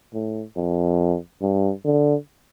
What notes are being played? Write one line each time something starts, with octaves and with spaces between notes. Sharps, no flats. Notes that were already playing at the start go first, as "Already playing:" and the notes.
A2
F2
G2
D3